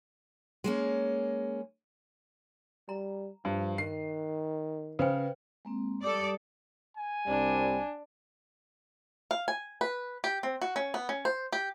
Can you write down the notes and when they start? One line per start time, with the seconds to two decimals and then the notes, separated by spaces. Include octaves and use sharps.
0.64 G#3 A#3 C#4
2.89 G3 A#5
3.45 G2 F3
3.78 D#3 C7
4.99 C#3 B4 C5 G5
5.65 G#3 A#3 C4
6.02 G3 G4 A4 D5 D#6
6.97 G#5
7.27 C2 G3 C4 D4
9.31 F5
9.48 G#5
9.81 B4
10.24 G4
10.43 C4
10.61 F#4
10.76 C#4
10.94 B3
11.09 C#4
11.25 C5
11.53 G4